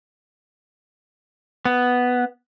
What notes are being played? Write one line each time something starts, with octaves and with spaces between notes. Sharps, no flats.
B3